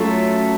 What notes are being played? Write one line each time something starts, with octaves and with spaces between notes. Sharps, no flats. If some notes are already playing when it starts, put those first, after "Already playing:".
Already playing: F#3 A3 C#4 F4